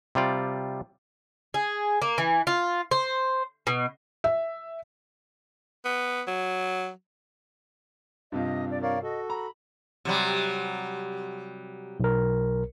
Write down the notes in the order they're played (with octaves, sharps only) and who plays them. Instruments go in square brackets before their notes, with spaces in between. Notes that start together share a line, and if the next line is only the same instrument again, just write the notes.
[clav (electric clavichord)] C3 G3 F4 D5
[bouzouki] G#4
A#3
E3
F4
C5
B2
[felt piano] E5
[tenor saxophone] B3
F#3
[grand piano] G2 C3 F4 [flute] D#5
[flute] D5
[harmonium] A#4 C#5 D5 [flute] F5
[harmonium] F#4 A4 [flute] D#5
[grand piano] A#5 [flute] B5
[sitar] C3 F#3 G3
[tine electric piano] B1 A#4